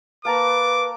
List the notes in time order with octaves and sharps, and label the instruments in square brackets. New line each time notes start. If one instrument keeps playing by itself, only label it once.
[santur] A#3 A5 A#5 [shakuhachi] B4 [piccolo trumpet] D6